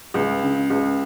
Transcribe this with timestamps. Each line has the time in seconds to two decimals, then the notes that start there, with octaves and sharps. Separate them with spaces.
0.14 C#2
0.43 C#3
0.70 C#2